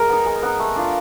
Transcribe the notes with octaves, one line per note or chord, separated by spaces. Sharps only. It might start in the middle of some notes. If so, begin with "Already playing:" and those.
Already playing: G#3 A#4
B3 D#4
G#3
B3 D#4
A3
D4 F4